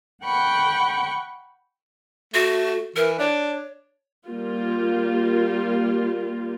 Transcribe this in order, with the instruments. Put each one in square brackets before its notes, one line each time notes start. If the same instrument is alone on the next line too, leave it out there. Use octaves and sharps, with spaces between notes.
[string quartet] F#5 G5 B5 C#6
[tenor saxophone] A3 [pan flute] F#4
[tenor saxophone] E3 [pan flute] A#4
[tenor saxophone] D4 [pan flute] C#5
[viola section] G3 A#3 F4